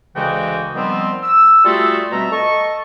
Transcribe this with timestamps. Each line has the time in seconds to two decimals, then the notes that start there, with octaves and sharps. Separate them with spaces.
0.16 D2 C#3 E3 G#3 F#4 G5
0.75 D#3 F3 G3 B3 C4
1.23 E6
1.65 G3 A3 F4 F#4 G#4 A4
2.12 B2 G3 A3 C4 E5 A#5
2.32 A4 D#5 C#6